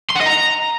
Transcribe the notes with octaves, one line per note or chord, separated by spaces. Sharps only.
C6
F#5
D#5
A#5